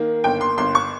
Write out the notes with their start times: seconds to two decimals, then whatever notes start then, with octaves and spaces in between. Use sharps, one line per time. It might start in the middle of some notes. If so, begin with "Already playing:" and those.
Already playing: D#3 A#3
0.24 G1 G5
0.41 C6
0.57 G1 C6
0.75 C#6